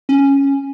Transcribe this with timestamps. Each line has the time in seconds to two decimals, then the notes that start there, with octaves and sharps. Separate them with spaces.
0.09 C#4